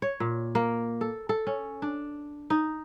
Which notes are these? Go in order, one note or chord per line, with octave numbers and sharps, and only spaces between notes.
C#5
A#2
A#3
A4
A4
C#4
D4
D#4